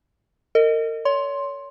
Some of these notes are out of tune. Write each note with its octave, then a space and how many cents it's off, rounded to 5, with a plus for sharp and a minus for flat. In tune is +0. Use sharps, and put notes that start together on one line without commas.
A#4 -35 D#5 +0
C#5 +30 C6 +10